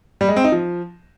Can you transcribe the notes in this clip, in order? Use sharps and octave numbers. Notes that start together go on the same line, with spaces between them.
G3
G#3
C4
D#4
F3